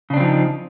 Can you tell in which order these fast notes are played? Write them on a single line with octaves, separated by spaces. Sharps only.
C#3 D4 C4 F3 D#4